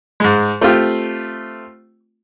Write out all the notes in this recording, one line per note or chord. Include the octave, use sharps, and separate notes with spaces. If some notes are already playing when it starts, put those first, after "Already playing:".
G#2 G#3
A3 C4 F4 G4